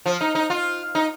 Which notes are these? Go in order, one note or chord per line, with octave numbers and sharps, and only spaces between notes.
F3
D#4
D#4
F4
D#4